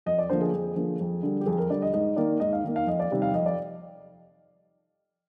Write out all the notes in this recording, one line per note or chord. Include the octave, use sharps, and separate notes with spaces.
F2 D#5
D5
D3 F3 A#3 C5
G#4
F2
D3 F3 A#3
F2
D3 G3
G4
F2 G#4
A#4
D3 G3 D5
D#5
G#2 D#5
D#3 A#3 D5
G#2 D#5
F5
D#3 A#3
F5
F2 D#5
D5
C3 D#3 G3
F5
F2 D#5
D5